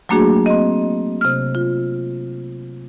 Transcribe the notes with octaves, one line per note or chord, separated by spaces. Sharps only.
F#3 A3 A#3 D4 F#4 G#4
C4 D#5
C3 F6
F4